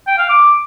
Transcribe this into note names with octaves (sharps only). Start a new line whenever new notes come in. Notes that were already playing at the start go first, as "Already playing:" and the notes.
G5
F5
D6